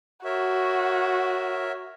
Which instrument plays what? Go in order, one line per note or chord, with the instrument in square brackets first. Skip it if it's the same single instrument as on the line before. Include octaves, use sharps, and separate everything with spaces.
[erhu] F#4 [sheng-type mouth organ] A#4 C#5 E5